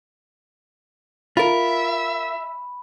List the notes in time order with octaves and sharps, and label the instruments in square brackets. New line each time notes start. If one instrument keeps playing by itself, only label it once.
[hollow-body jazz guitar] F4 A#4 [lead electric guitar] E5 [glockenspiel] B5